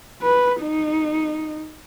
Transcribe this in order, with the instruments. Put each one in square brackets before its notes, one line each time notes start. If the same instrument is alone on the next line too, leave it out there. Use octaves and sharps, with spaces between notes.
[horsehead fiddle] B4
D#4